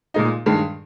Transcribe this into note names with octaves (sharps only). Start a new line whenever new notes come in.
A#2 G#3 D#4
G2 D#3 G#3